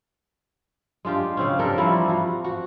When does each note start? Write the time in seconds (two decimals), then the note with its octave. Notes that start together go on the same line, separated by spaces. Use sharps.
1.05 G#3 D4 F4 G4
1.37 C#3 C4 C#4
1.59 D4 G4 A4 A#4
1.78 E3 F3 G3 E4
2.09 F3 F#4
2.44 F#4